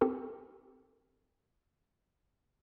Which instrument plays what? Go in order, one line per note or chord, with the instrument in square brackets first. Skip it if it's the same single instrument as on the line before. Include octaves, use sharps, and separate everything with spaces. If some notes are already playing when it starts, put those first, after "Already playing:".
[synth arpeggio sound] C4 G4 A4 A#4